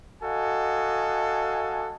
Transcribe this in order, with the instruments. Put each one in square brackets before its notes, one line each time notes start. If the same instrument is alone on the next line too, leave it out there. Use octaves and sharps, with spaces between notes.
[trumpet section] F#4 A4 D#5 F5 G#5